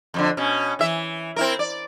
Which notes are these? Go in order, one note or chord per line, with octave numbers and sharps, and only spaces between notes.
F2 B2 D3
B2 C#4
E3 E5
C4 E4 A#4
D5